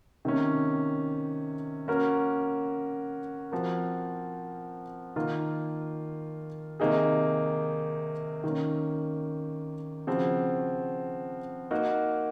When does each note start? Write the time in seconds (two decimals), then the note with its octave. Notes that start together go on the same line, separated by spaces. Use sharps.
0.25 C3 D#3 A#3 C#4
1.88 A#3 C#4 F#4 A#4
3.52 F3 C4 F#4 A#4
5.16 D#3 A#3 F4 A#4
6.80 C3 D#3 A#3 D#4 G#4
8.44 D#3 A#3 C#4
10.07 C#3 F3 C4 F#4
11.71 A#3 D#4 F#4 A#4